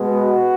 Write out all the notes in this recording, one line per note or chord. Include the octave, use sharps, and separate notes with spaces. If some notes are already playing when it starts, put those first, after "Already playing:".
Already playing: B2 G#3 B3
F#4